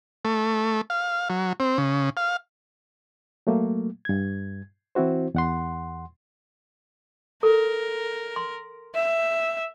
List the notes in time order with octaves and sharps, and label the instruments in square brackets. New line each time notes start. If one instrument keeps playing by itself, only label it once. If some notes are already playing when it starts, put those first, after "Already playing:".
[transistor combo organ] A3
F5
F#3
C4
C#3
F5
[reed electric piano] F#3 A3 A#3
G2 G#6
E3 C4 E4 F#4 C5
E2 F#5 C6
[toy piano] A4 [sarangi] A#4
[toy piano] C6
[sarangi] E5